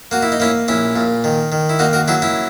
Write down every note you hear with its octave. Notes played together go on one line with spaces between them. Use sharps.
A#3 F#4
E4
D#4
A#3 C#4 E4
A#1 C#4 E4
A#2
D#3
D#3
E4
A#3 D#4 F#4
F#4 A#4
F#3 E4 G#4
C#4 E4